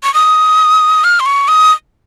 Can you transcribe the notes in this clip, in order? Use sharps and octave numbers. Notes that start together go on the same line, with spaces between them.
C#6
D#6
F6
C6
C#6
D#6